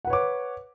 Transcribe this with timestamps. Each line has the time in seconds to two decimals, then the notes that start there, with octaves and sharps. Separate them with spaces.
0.05 F#5
0.07 B4
0.10 C#5
0.13 D6